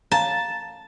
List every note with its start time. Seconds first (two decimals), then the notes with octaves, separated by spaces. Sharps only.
0.12 F5 A5 A#5